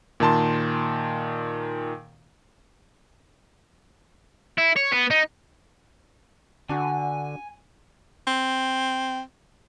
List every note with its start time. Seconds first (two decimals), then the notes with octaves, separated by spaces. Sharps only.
0.20 A#2 D#3 A5 C6
4.58 E4
4.77 C#5
4.92 B3
5.11 D#4
6.69 D3 D4 F#4 G#5
8.27 C4